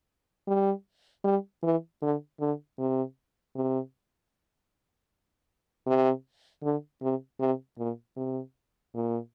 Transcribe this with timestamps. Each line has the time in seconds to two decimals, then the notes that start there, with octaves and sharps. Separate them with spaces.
0.48 G3
1.24 G3
1.63 E3
2.02 D3
2.40 D3
2.79 C3
3.56 C3
5.87 C3
6.63 D3
7.02 C3
7.40 C3
7.78 A#2
8.16 C3
8.95 A#2